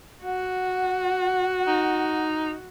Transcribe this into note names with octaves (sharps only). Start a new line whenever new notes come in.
F#4 F#5
D#4